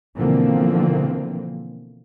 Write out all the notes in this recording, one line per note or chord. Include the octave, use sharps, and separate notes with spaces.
B2 D3 E3 F3 A#3 C4